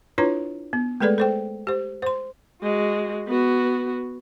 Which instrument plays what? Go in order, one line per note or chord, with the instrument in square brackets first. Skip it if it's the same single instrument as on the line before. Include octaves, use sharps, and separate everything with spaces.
[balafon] D4 E4 F4 B4 C#5 A#5
B3
G#3 A3 G#4 A4 B4 D5
A4 C5 G5
G4 C5
C5 C6
[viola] G#3 F#4
B3 F#4